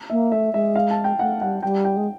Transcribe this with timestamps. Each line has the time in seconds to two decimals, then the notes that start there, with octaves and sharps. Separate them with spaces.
0.10 A#3 E5
0.32 A3 E5
0.53 G#3 E5
0.76 F5
0.91 A5
1.04 G5
1.19 A3 F#5
1.41 G3 F#5
1.63 G3 G5
1.85 G5
1.96 G#3